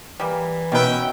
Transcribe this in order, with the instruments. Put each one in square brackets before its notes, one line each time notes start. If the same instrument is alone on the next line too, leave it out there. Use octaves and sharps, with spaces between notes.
[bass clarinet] E3 [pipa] G3 A#3
[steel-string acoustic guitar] B2 [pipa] D#3 B4 [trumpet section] C#4 E5 G5